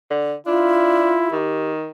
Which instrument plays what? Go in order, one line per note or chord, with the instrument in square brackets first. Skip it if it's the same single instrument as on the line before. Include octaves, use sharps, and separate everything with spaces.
[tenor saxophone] D3
[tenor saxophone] D4 [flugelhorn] E4 [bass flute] F4
[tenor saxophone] D#3 [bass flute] G4